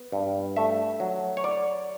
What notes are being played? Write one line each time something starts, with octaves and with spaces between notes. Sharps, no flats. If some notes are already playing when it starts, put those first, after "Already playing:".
Already playing: B3
G2
A3 E5
F#3
C#5
D5